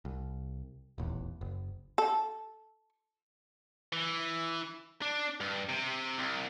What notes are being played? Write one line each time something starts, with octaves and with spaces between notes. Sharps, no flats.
C2
D#1 A1 E2
F#1
A4
E3
D4
G2
C3
C2